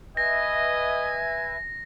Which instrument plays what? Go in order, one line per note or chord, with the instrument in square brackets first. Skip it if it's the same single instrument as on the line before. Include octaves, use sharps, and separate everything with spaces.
[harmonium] B4 E5 [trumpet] D#5 [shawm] G#5 [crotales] A#6